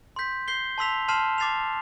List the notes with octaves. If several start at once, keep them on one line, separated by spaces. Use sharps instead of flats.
C6 G6 B6
G6 C7 G7
A5 C6 E6 B6 F7
A5 C6 F6 C7 E7
D6 A6 C7 F7